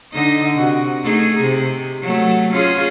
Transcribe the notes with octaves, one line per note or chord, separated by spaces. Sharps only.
D3 D#4 D#5
C3 F#4
A3 D#4 G#4
C3
F#3 A3
C#4 F4 G#4